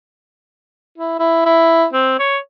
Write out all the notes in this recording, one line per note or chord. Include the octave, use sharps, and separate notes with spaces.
E4
E4
E4
C4
C#5